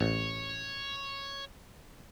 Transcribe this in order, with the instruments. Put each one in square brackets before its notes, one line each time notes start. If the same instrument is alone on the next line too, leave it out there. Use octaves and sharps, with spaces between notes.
[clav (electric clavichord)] A1 [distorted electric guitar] C#5